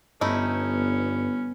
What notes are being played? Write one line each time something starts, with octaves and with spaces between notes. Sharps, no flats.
G1 G2 A3 B3 C#4 D#4 E4